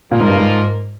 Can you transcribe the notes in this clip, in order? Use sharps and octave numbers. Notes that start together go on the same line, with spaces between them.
A#2 F3 A#3 F4 A#4
G#2
G2
G#2